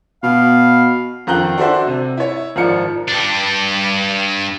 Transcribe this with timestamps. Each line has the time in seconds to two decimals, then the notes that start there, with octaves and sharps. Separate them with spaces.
0.23 B2 F5
1.27 F2 D#3 F4 A#5 F#6 G7
1.57 D4 F#4 A4 C5 E5
1.87 C3
2.17 E4 C#5
2.56 G#1 F3 F4 A#4 D5 C#7
3.08 G2 D4